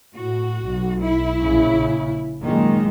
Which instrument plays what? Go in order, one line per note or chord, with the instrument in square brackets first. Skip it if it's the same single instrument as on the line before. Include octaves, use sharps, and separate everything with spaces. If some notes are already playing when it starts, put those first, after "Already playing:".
[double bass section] A2 [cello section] F#4
[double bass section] B1
[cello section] E4
[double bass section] A#1 C#3
[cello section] F#2 A#2 D#4 [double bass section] D#3 G#3